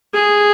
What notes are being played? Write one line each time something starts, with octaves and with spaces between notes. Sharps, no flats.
G#4